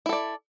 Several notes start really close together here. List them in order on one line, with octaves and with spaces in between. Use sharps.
E4 A4 D5